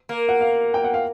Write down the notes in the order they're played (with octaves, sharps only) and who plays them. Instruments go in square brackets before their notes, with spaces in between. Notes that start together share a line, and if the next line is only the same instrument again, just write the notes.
[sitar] A#3
[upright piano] F#5
F5
G5
F#5
F5